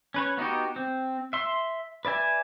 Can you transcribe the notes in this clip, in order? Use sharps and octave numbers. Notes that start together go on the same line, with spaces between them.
C#4 B4 C#5
B3 D#4 F#4 G4
C4
E5 C6
B4 D5 E5 G#5